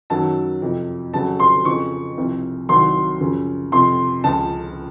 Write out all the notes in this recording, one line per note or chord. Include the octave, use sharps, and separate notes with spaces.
F#2 D#3 F#3 A5
F2 C3 F3
F2 C#3 F#3 A5
C6
F2 C#3 F3 C#6
C2 C3 F3
C2 C3 D#3 F#3 C6
F#2 C#3 F3
F2 C3 F3 C6
C#2 C#3 F3 A5